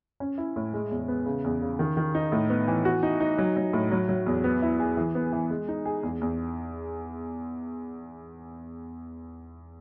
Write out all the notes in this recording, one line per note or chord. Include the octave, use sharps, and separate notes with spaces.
C#4
E4
A2
G#3
E2
B3
C#3
E2
C#3
D#3
D#3
D#4
A2
B3
E3
F#4
D#4
D#4
F#3
F#3
A2
F#3
F#3
E2
B3
E4
G#4
E3
B3
E3
G#3
D#4
G#4
E2
E2